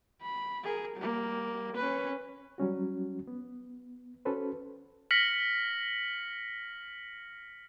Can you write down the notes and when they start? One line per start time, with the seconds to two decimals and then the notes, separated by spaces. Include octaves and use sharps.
0.22 B5
0.63 G#4 A#4
0.97 G3 A#3
1.77 C#4 B4
2.58 F#3 G3 C#4 F#4
3.27 B3
4.25 C#4 F#4 A4 B4 C5
5.11 F6 A#6 B6 C#7 F#7